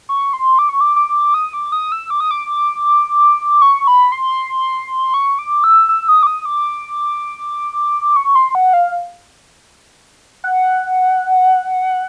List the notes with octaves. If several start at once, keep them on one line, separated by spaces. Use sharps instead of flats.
C#6
C6
D6
C#6
D6
D6
D#6
D6
D#6
E6
D6
D#6
D6
C#6
B5
C6
C#6
D6
E6
E6
D#6
D6
D#6
D6
C#6
C6
F#5
F5
F#5